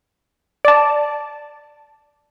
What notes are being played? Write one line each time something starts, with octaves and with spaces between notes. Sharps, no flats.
D5 A5